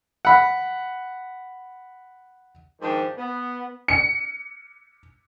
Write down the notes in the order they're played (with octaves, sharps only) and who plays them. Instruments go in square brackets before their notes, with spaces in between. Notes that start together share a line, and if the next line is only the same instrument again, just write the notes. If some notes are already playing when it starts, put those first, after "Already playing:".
[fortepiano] F#5 B5
[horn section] G#2 D#3 F3 D4 G4
B3
[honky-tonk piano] C#7